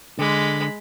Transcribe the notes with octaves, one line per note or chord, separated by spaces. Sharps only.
D3 G#3 B5